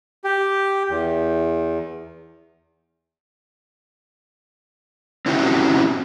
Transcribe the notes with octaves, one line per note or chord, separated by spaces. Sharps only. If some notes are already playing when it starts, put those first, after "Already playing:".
G4
E2
C4 C#4 E4 F#4 G4